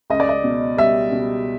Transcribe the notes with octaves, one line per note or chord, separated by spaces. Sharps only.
C#2 D#5
D5
D#5
B2
G3 E5
B2